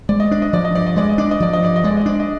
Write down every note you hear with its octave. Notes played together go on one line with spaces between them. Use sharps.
G#3 D5
D#5
D4 D5
D#5
F3 D5
D#5
G2 D5
D#5
G#3 D5
D#5
D4 D5
D#5
F3 D5
D#5
G2 D5
D#5
G#3 D5
D#5
D4 D5
D#5